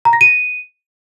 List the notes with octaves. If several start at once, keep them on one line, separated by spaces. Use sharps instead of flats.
A#5
A#6
D#7